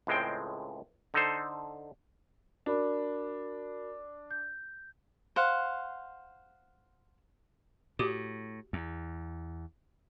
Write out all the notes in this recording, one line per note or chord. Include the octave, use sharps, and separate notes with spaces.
C#2 A2 G#3 C4 G5
D3 D#4 A4 C5
D4 F#4 A#4 B5
G6
C5 F5 F#5
A2 F#4 G4 D6
E2